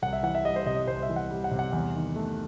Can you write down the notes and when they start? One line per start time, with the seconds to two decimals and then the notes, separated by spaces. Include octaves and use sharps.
0.02 C2 F#5
0.13 E5
0.23 E3 F#5
0.35 E5
0.45 G3 D#5
0.56 C5
0.66 C3 D#5
0.77 D#5
0.88 C2 C5
1.03 E5
1.09 E3
1.16 F#5
1.31 G3
1.44 F#5
1.51 C3
1.59 F#5
1.73 E2
1.95 D#3
2.16 A3